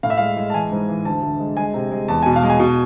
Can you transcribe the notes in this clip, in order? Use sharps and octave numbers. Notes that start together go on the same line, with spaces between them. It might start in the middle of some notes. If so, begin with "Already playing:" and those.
A2 F5
E5
G#3 F5
G#3
A5
E3 G#5
G#2
E3
D2 A5
D2
G#3
G#3 G#5
C3
G#3
E2 A5
B2 G#5
F5
G#3
G#5
B2